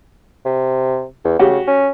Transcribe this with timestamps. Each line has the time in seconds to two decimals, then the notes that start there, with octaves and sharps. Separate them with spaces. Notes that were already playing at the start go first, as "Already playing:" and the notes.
0.45 C3
1.25 E2
1.39 C#3 F#4 G4
1.67 C#4